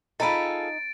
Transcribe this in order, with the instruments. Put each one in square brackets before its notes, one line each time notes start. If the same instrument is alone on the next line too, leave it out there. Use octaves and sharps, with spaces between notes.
[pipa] C4 B5 [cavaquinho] D#4 [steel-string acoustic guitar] F4 G#4 A4 [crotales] A6 D7